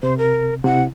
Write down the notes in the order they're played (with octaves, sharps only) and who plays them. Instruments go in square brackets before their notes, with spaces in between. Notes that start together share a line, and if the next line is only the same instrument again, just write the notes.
[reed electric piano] C3 [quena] C5
[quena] A#4
[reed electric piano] C3 E4 [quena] F#5